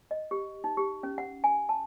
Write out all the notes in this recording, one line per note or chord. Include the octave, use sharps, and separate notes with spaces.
D#5
G4
D#4
G4
C#4
F#5
G#5
A5